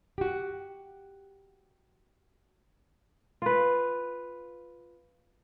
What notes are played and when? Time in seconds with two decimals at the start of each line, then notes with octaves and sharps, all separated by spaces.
0.18 F#4 G4
3.42 F4 B4